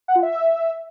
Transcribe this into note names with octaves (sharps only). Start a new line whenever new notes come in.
F#5
F4
E5